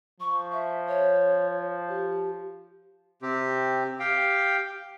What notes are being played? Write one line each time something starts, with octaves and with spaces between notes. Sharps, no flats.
F3 C#6
E5
C#5
G4
C3 C4 G4
G4 F5 G5